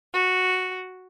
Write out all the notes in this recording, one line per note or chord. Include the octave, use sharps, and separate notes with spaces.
F#4